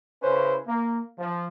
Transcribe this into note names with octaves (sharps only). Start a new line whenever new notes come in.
C#3 C#4 E4 B4 C5
A#3
F3